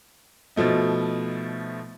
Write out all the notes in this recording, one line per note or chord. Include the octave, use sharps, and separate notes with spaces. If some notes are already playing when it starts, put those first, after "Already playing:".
B2 F3 A3 D#4